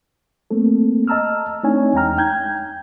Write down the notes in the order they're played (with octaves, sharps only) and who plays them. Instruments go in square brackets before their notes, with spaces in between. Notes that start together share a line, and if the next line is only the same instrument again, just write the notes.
[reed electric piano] A3 A#3 C4 A4
D#5 A5 A#5 E6 F6
A3 C4 D4 D#4 C#5 G#5
E2 G#3 D#4 G5 A#5 F6
G5 G6 G#6